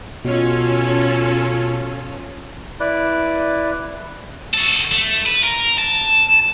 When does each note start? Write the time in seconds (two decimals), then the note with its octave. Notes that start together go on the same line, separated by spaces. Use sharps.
0.25 B2 C#4 F4 A4
2.80 E4 B4 D5
4.54 F#4 A4
4.92 A3
5.26 B4
5.44 A#4
5.78 A5